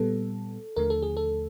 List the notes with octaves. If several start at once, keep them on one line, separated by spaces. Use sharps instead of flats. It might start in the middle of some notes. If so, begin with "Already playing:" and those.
Already playing: A#2 G3 B3 A4
D#2 D3 F3 A3 A#4
A4
G#4
A4